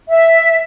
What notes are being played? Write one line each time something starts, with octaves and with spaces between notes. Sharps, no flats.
E5